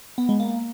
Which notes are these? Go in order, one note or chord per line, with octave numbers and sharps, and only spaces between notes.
B3
G#3
A#3